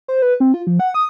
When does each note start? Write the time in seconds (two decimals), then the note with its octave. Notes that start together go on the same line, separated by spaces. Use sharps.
0.08 C5
0.22 B4
0.40 C4
0.54 F4
0.67 F3
0.80 F#5
0.94 D#6